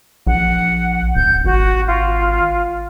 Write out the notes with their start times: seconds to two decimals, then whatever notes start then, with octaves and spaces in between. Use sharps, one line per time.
0.27 A#1 F#5
1.15 D1 G6
1.45 G#1 F#4
1.87 F4